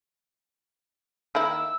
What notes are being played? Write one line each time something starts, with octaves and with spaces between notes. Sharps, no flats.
D#3 A#3 E4 E6